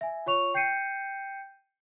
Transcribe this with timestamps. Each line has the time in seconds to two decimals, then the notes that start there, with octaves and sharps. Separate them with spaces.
0.01 E5 G#5
0.26 F4 C#5 C#6 F7
0.54 G5 G6 C7 C#7 D#7